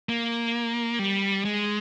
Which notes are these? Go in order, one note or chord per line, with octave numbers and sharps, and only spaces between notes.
A#3
G3
G#3